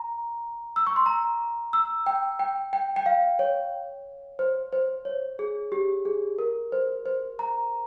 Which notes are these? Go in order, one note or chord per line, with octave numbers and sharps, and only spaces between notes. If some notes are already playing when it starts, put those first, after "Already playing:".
Already playing: A#5
E6
C#6
C6
A#5
E6
G5
G5
G5
G5
F5
C#5
C5
C5
C#5
G#4
G4
G#4
A#4
C5
C5
A#5